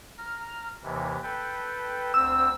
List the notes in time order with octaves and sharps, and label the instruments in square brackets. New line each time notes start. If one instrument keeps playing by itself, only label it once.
[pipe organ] A#5 F6
D#2 C3 E3
A4 B4 G5
[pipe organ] D2 C4 [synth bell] E6